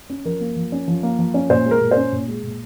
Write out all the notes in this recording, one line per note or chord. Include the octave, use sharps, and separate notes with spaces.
C#4
F3 A#4
A#3
F3
C#4
F3
A#3
F3
C#4
A#2 C5
G#3
A#4
A#2
C5
C#4
A#2
G#3
A#2